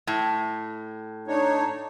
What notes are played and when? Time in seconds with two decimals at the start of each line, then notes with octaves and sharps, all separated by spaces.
0.07 A2
1.28 D4 D#4 C#5